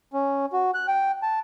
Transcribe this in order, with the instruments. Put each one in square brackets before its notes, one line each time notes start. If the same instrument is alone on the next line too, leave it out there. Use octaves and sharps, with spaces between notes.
[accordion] C#4
F#4
F#6
G5
A5